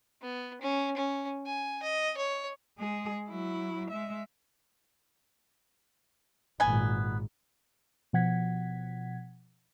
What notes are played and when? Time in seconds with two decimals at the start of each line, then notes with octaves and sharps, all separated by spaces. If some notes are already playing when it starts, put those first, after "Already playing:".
0.22 B3
0.61 C#4
0.97 C#4
1.46 G#5
1.83 D#5
2.17 C#5
2.78 G#3 G#4
3.28 F#3 E4
3.90 G#3 E5
6.60 G#1 A#2 B3 G#5
8.13 B2 F3 F#5 G#6 B6